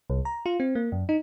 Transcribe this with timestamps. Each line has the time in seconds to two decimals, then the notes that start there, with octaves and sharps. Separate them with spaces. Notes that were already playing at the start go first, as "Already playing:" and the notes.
0.10 C2
0.25 A#5
0.46 F4
0.60 C4
0.75 A#3
0.92 F#2
1.09 D#4